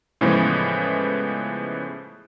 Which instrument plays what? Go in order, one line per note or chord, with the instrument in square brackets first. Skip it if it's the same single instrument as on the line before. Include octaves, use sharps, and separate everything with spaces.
[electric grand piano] A2 C#3 E3 F3 G#3 B3